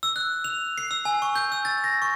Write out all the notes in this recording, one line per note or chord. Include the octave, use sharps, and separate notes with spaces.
E6
F#6
F7
C7
E6
G#5
C#6
G6
E6
A6
A#6
C#6